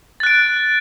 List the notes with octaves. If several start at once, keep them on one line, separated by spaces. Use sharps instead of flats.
F#6 A6 D7